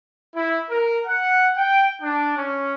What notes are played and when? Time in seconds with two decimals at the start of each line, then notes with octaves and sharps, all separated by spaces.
0.35 E4
0.70 A#4
1.06 F#5
1.56 G5
2.02 D4
2.36 C#4